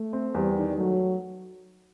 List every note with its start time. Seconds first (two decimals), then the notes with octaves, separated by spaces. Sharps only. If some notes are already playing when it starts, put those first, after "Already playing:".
Already playing: A3
0.13 C4
0.34 E2 G3
0.56 D#3
0.77 F#3 A3